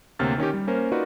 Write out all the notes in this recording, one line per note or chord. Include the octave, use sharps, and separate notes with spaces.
D2 C3 A#3 C#5 F6 A6
D#3 C#4 D#4 G4
G3
A#3 C#4 A#4 C5
D#4 F4 F#4 A#4 B4 D5